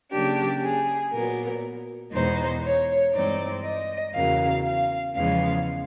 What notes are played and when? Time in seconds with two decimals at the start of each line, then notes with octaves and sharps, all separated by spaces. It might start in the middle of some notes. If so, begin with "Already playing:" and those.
0.11 C#3 F#3 A#3 D4 G4
0.62 G#4
1.12 A#2 F#3 B3 A#4
2.12 E2 B2 G#3 B3 D#4 C5
2.64 C#5
3.14 G2 E3 G#3 C4 D#4 D5
3.64 D#5
4.14 E2 C#3 F#3 A#3 F5
4.64 F5
5.15 E2 C#3 F3 G#3 B3 F5